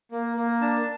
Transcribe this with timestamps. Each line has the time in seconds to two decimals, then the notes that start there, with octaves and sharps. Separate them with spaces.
0.12 A#3
0.37 A#3
0.61 D4 A5